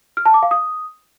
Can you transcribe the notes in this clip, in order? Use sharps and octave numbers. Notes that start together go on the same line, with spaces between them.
F6
A5
D6
F5
D#6